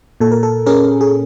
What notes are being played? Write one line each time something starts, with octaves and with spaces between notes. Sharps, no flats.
A#2 A4
A#4
A4
C#4 G#4 A#4
G#4